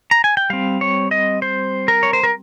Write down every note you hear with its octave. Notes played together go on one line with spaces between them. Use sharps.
A#5
G#5
G5
G3 C4 F5
C#5
D#5
C5
A#4
C#5
C5
A#4